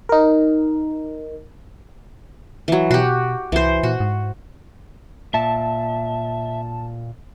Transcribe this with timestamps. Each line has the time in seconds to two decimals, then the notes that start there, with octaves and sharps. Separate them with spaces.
0.09 D#4 A#4
2.68 E3 F#3
2.91 B2 F#4 G4
3.52 C2 E3 C5
3.83 A#2 F#4
4.00 G#2
5.34 A#2 E5 A5